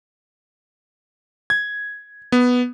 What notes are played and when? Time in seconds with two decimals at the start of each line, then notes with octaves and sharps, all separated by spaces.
1.50 G#6
2.32 B3